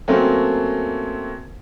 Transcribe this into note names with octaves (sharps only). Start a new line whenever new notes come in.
F#3 A3 A#3 C4 C#4